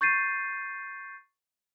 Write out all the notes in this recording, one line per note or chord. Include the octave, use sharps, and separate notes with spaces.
C#6 G6 A6 C7 D#7